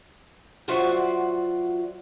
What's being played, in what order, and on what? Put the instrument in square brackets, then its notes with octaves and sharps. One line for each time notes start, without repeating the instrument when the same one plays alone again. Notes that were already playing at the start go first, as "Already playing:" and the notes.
[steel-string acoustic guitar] F#3 F4 F#4 C5 D5 E5